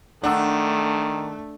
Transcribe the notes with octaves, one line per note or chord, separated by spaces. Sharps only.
D#3 A3 D4 F#5 E6